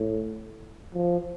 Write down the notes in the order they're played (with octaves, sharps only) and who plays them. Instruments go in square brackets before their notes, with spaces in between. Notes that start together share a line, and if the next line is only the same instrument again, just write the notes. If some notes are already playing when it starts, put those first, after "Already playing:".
Already playing: [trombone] A2
F3